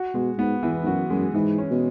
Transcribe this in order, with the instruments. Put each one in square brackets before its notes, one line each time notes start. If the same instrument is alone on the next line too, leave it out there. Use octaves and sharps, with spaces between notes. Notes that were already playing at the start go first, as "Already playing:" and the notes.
Already playing: [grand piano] F#4
[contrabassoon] B2 [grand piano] G#3
[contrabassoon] G#2 [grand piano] B3
[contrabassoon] E2 [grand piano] E3
[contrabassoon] G#2
[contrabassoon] F#2 [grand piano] F#4
[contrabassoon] F#2 [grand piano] G#3
[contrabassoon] G#2 [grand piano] E3
[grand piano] C#4
[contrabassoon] B2